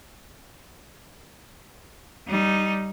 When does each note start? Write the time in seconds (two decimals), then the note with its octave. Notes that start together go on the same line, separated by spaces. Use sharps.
2.27 G3 D#4